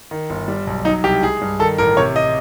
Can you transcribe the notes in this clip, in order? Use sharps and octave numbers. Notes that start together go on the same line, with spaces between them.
D#3
G1
G3
B1
F#3 D#4
C2 G4
G#3 G#4
G2
D#3 A4
A1 A#4
C3 C#5
D#5